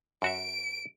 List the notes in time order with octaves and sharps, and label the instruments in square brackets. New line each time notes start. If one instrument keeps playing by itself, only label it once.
[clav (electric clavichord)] F#2 F#4 E5 [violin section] D7